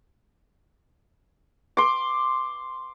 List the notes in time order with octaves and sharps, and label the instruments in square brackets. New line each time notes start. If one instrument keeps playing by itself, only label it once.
[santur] C6 D6